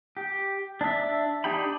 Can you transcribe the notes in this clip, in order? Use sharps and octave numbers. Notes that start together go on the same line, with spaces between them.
G4
D4 E5
D4 D#4 G4 G5 B5